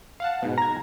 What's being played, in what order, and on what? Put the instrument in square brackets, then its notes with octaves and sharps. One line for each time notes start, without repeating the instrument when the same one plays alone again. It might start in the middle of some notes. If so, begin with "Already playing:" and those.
[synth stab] F5 F#5 A5
G#2 B2
[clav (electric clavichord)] A#5 [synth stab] G#6 A#6